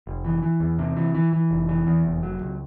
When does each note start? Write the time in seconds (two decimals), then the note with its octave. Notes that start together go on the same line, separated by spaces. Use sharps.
0.07 F1
0.25 E3
0.43 E3
0.60 E2
0.79 C3
0.97 E3
1.15 E3
1.33 E3
1.51 F1
1.69 E3
1.87 E2
2.05 F1
2.23 F#3
2.41 C#2